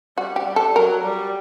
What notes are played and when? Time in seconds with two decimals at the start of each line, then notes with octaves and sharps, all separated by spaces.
0.17 G3 F#4
0.36 G4
0.46 G3
0.56 A4
0.75 F#3 A#4
1.04 G3